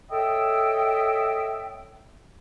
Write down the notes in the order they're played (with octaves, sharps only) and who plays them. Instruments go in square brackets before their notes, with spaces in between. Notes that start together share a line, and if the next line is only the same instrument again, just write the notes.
[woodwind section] A4 C#5 D#5 E5 G5